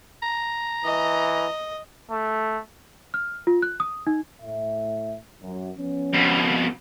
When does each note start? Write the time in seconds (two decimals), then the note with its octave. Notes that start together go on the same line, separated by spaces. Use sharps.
0.22 A#5
0.85 E3 D#5
2.11 A3
3.14 F6
3.47 F4
3.62 F#6
3.80 D#6
4.07 D#4
4.41 A2 E5
5.41 F#2
5.78 F3 B3 C#4
6.14 F2 B2